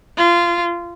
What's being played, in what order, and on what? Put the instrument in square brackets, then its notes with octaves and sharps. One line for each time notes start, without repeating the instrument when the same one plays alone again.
[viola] F4